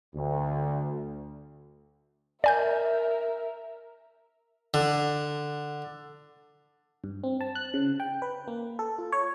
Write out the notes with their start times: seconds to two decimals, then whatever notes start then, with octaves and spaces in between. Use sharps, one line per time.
0.15 D2
2.44 A#4 D5 E5 G#5 G6
4.74 D3
7.04 G2
7.24 C4
7.41 A5
7.55 F#6
7.74 C#3
8.00 G5
8.22 B4
8.48 A#3
8.79 A4
8.98 F4
9.12 C#5